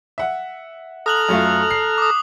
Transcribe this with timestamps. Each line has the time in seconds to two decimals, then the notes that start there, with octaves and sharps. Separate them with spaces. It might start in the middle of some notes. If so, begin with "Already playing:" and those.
0.18 E5 F#5
1.06 A4 A#5 D#6 F6 F#6 F#7
1.29 F#2 A3 F4
1.70 C7
1.98 D6 D#6